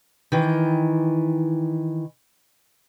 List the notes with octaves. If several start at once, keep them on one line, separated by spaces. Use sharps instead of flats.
D#3 E3